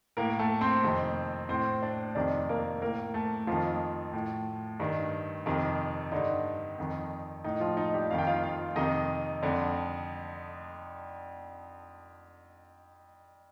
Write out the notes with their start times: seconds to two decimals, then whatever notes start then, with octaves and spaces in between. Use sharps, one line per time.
0.17 A2 A#3 A#4
0.39 A3 A4
0.61 C4 C5
0.83 F2 C3 D#3
1.49 A2 C4 C5
1.82 D4 D5
2.15 F2 C3 D#3 D4 D5
2.49 A#3 A#4
2.81 A2 A#3 A#4
3.14 A3 A4
3.47 F2 F3 F4
3.52 D#3
4.13 A2
4.80 G2 D#3
5.46 F2 C3 D#3
6.12 G2 D3 D#4
6.78 F2 D#3
7.44 A2 D#4
7.60 F3 F4
7.77 D#4
7.94 G3 G4
8.10 F2 F5
8.14 D#3 G5
8.27 F4 F5
8.43 F4 F5
8.76 F2 C3 D#3 D#4 D#5
9.43 F2 D3